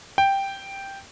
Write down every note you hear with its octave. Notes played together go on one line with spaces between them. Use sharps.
G5